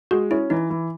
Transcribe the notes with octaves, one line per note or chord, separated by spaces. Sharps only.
G#3 F#4
C#4 E4
E3 D#4
E3